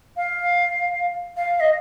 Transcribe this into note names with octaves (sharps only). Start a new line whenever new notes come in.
F5
F5
D#5